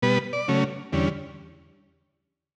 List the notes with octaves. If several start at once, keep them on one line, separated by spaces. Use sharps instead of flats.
B2 G3 B3 B4
D5
C#3 F#3 A3 C#4
E2 D3 G3 C#4